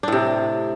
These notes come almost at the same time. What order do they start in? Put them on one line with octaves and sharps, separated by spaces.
D4 A2 C3